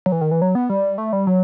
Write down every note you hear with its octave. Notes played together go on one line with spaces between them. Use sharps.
F#3
E3
D#3
E3
F#3
B3
G3
A3
G3
F#3